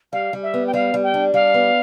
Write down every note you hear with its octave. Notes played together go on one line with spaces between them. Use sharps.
G3 F5
G3
E5
B3
G5
G3 F5
G3
G5
D4
G3 F5
B3